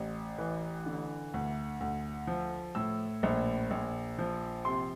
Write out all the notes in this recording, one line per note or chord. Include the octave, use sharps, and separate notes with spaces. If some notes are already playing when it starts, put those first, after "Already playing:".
Already playing: A1
E3
D3
D2
D2
F3
A2 E6
A#1
A#1
F3
C3 C6